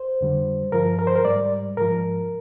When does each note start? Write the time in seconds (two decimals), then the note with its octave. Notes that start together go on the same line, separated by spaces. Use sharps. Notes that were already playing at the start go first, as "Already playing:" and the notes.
Already playing: C5
0.21 F2 D3 G3
0.72 G2 F3 A#4
0.99 A#4
1.07 C5
1.16 A#4
1.25 G#2 G3 D5
1.77 G#2 F3 A#4